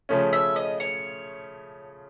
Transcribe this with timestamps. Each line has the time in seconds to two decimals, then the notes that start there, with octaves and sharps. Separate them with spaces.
0.09 C#3 F3 A3 C#4
0.33 E5
0.56 D#5
0.80 C#5